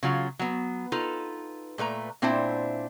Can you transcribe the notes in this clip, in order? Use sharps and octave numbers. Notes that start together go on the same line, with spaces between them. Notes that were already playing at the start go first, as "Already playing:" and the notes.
C#3 F#3 F4
F#3 B3
D#4 F4 A4 B4
A#2 A3 B4 A#5
A#2 C4 D4 E4 C5 E5